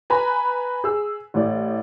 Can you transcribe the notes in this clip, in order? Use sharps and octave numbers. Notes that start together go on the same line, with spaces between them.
B4 G#5 A#5 B5
G#4 E6
A1 A2 D5